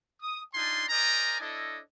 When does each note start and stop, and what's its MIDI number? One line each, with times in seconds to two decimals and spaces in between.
0.21 0.41 87
0.54 0.84 62
0.54 0.84 63
0.54 0.84 65
0.54 0.84 80
0.54 0.84 81
0.54 0.84 84
0.89 1.37 70
0.89 1.37 72
0.89 1.37 74
0.89 1.37 75
0.89 1.37 80
0.89 1.37 82
1.40 1.79 62
1.40 1.79 64
1.40 1.79 69
1.40 1.79 73
1.40 1.79 75